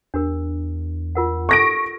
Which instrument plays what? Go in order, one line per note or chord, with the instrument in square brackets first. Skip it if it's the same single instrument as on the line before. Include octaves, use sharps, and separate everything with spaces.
[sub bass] E2 [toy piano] D4 G4 A#4
[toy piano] F4 A#4 F#5
[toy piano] A4 D6 [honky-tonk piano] C#6 A#6 D7